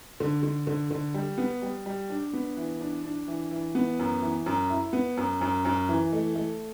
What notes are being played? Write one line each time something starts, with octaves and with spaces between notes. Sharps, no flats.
D3
D3
D3
D3
G3
B3
G3
G3
D4
B3
E3
D4
D4
E3
E3
B3
F#2
E3
F#2
E4
B3
F#2
F#2
F#2
E3
A3
A3